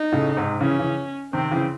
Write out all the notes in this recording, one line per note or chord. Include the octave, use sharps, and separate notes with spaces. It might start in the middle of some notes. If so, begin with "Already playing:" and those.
Already playing: D#4
A2 C#3
G#2 C3
C#3 E3 C#4
C#3 E3
C3 D#3 C4
C#3 E3